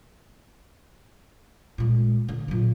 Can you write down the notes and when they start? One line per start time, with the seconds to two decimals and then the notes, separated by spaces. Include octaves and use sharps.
1.78 A#2 G#3
2.29 D3
2.48 A#2 F#3